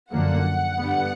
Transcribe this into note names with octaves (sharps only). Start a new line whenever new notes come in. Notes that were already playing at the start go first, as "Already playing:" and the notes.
F#2 D3 F3 A#3 F#5
G2 D3 G3 B3